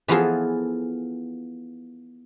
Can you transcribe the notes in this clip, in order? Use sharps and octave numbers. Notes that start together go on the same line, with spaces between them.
E3 F3 B3 F4 G#4 A4